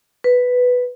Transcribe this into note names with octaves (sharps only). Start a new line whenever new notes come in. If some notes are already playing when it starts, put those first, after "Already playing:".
B4